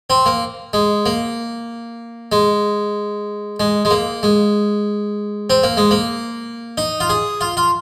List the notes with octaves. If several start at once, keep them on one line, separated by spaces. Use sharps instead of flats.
C4
A#3
G#3
A#3
G#3
G#3
G#3
A#3
G#3
C4
A#3
G#3
A#3
D#4
F4
G#4
F4
F4